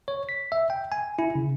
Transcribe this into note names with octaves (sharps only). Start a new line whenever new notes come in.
C#5
B6
E5
G5
G#5
E4
C#3